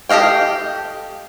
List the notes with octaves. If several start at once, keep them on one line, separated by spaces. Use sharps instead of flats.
G4 A4 D#5 F5 G5